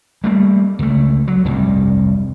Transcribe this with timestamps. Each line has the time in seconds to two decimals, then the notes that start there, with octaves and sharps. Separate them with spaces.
0.24 G3 A3 A#3
0.79 C#2 A3
1.28 F#3
1.45 F1 C2 G2